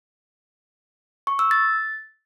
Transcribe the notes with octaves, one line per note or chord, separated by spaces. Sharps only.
C#6
E6
A6